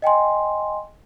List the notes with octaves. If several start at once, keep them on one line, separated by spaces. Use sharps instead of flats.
D#5 G5 G#5 C6